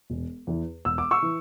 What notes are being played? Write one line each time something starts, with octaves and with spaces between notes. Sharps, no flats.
E1
E2 E3
E1 E6
D6
C#6 E6
E3